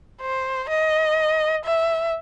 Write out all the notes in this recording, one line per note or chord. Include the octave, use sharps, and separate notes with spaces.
C5
D#5
E5